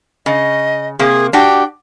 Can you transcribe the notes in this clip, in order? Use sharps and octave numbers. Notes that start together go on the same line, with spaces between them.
C#3 D#5
C3 A#3 G#4
D4 F#4 G4 G5